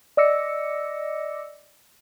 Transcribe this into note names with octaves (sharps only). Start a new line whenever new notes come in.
D5 D#5 D6 E6 A#6 C#7